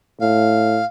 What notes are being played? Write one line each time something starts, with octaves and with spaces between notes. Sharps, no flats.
A2 F5